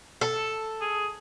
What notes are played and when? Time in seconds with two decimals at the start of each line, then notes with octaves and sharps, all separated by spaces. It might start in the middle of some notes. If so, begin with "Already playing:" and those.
0.21 A4
0.81 G#4